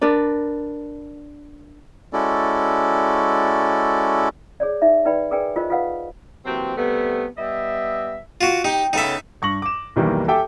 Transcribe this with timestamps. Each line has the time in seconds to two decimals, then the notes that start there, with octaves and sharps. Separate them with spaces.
0.01 D4 A#4 B4 D5
2.13 G#3 C#4 E4 F#4 A4 D5
4.60 G#4 C#5 D5
4.82 D#4 E5
5.05 D#4 B4 D5 G5 B5
5.31 G#4 A#4 B4 D5 G5 G#5
5.56 F4 A#4 C5 D#5
5.70 F4 A4 B4 F5 F#5
6.46 C3 E3 F#3 A#3 C4
6.76 C3 G3 A3 B3
7.37 G3 B3 D#5 E5
8.41 F4 F#4
8.65 D#4 G4
8.93 C#3 B3 D#4 A4 E5
9.42 G2 C#6 A#6 F#7
9.62 D6 E7
9.96 B1 E2 D#3 E3 G3 A#3
10.28 G4 A4 E5 G5 G#5 D6